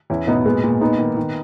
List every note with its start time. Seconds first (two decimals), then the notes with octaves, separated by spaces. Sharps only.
0.10 E2 C#4 E4
0.27 B2 B3 D#4
0.45 A#2 G#3 B3
0.64 A#2
0.81 G#2 B3 D#4
0.99 D#3
1.17 D#3